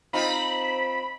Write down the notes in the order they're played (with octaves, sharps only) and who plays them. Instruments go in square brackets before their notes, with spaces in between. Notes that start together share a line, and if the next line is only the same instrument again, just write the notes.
[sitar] C4 D#4 F4 [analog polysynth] B5